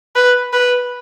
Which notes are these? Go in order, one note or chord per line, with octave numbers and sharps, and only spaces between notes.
B4
B4